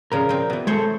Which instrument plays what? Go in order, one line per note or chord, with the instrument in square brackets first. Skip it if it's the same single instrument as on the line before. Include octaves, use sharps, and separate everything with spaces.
[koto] A#2 C#3 F3 [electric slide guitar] A#4
[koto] A#2 C4
B2 E3
[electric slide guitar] G#3 A4 [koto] C5 C#5